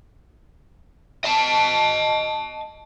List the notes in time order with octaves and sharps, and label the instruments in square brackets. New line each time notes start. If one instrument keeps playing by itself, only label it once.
[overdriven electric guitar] D#5 A5